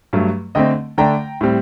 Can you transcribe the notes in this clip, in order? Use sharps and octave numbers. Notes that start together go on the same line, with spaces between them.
G2 F#3 A3
D3 A3 C4 D#5 G5
D3 A3 D4 G5 A#5
A2 G3 C4